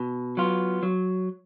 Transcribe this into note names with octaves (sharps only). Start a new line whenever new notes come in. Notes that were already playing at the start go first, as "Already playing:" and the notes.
Already playing: B2
F#3 B3 F4
F#3